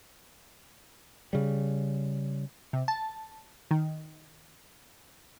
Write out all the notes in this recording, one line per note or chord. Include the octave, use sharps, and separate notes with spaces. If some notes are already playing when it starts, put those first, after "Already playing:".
C#3 G3
C3
A5
D#3